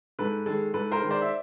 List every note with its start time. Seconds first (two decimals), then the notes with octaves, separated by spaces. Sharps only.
0.19 G#2 A4 B4
0.46 D#3 G#3 A4
0.74 G#2 A4 B4
0.91 A#4 C5
1.01 D#3 G#3
1.10 C5 D5
1.22 E5